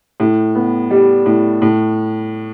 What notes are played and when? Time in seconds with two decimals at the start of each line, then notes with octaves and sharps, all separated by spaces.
0.20 A2
0.55 B3
0.91 G3
1.26 A2
1.62 A2